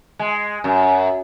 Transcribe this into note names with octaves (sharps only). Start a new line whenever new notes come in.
G#3
F#2